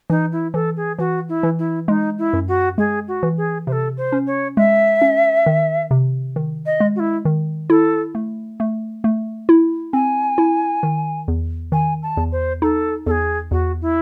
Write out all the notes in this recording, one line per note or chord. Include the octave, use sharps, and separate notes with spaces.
E3 D#4
E4
E3 A4
G#4
E3 F#4
E4
E3
E4
G#3 D#4
E4
F#2
F#4
G#3 G#4
F#4
E3
G#4
C3 A4 C5
C5
C#4
C#5
G#3 E5
C#4
D#3
C3
D#3
D#5
G#3
F#4
E4
D#3
E4 A4
A3
A3
A3
E4
C4 G#5
E4
D#3
E2
D#3 G#5
A5
E2
C5
D#4 A4
E2 G#4 A4
E2 F#4
E4